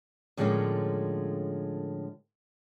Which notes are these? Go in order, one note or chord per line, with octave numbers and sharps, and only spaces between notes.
A2 D3 F3 G#3 A#3 C#4